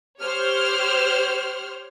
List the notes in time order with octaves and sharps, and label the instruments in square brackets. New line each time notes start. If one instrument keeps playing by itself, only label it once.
[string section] G4 C5 C#5 F6